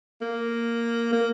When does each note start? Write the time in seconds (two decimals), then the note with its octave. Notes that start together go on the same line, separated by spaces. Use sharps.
0.22 A#3
1.13 A#3